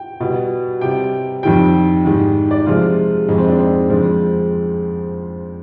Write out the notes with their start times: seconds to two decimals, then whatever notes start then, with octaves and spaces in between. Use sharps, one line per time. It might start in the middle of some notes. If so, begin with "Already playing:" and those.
Already playing: G5
0.20 B2 G3
0.81 C3 G3 G5
1.43 F2 D#3 G3 G5
2.05 G#2 D#3 G3
2.51 D5
2.66 C3 F3 G#3 F4
3.29 F2 D#3 G#3 D#4
3.38 C4
3.49 D4
3.59 C4
3.90 F2 D3 F3 G#3